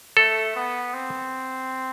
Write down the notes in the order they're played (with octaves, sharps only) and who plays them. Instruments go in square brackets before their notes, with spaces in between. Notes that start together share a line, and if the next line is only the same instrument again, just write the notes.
[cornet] A3 [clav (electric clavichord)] A4
[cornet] B3
C4